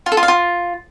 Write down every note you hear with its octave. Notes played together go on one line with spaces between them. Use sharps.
F4
A4
F4
F5
F4